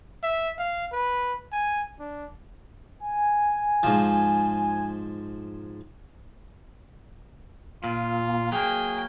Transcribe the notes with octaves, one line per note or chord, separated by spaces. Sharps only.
E5
F5
B4
G#5
D4
G#5
G#2 F3
A#2 F4
F#3 A#3 G#4 G5